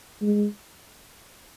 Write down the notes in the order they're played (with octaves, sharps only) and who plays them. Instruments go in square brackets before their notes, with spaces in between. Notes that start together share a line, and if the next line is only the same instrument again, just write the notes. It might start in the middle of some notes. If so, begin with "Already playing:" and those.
[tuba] G#3